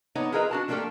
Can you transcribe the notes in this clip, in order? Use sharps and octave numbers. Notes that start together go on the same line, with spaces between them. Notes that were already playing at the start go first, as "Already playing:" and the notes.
B3 D4 D#4 C#5
E4 F4 G#4 A#4 B4 D#5
D4 F#4 A5
F3 A3 A#3 D4 G4 A4